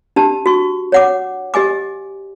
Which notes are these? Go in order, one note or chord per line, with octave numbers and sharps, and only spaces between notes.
D4 G4 A5
F#4 C#6
C#5 F#5 D6
G4 D#5 G#5 D6